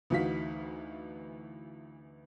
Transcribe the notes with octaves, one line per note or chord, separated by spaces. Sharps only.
D2 E3 D#4 F#4 F5 B6